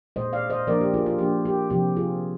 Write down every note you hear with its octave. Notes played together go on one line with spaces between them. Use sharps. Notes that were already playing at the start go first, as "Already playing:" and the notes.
A#2 G#3 D#4 C5 D#5
D5 F5
C5 D#5
F3 A#3 D4 A#4 D5
G4
F4 G#4
F4
F3 A#3 D4 G4
G4
C3 F3 C4 G4
F4 G#4